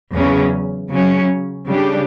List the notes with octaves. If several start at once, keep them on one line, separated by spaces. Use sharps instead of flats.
E2 C#3 F#3 C#4
C#3 F#3 C#4
C#3 G3 D4 G4